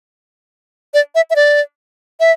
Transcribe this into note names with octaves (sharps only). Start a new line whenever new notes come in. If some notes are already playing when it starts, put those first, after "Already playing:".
D5
E5
E5
D5
E5